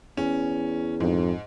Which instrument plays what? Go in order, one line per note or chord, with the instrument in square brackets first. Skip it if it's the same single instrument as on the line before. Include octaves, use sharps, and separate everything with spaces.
[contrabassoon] E2 [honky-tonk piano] C#4
[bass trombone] F2 [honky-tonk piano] G#2